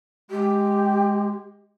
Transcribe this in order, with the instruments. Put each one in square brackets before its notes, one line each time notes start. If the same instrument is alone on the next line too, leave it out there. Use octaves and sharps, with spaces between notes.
[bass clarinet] G#3 [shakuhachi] G4